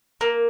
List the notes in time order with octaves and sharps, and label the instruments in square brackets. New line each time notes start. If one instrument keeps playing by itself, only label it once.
[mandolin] A#3